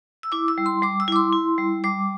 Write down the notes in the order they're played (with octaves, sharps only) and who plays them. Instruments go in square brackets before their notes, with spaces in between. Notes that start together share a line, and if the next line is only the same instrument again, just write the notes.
[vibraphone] E6
E4 D6
E6
G3
C6
G3 D6
E6
E4 D6
C6
E4
G3
G3 D6